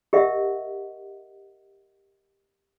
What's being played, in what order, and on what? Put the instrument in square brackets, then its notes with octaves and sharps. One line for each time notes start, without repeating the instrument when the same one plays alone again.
[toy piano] G4 A#4 D#5 E5 F#5